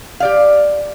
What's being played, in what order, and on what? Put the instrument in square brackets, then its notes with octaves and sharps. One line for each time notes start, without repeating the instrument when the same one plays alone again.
[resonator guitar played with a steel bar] G4 D5 F5